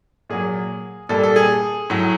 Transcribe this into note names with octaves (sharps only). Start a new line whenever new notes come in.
A#2 F#3 G#4
A#2 G3 A4
A4
G#4
A2 F#3